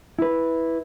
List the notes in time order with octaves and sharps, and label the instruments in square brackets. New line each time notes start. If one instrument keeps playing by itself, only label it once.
[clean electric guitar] E4 B4